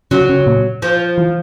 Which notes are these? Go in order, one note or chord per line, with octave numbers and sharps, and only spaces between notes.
C#3 F#3
C#3
A#2
F3
E3